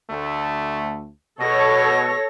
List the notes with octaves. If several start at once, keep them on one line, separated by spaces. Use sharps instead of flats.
D2 A3
B2 A4 C#5 A#6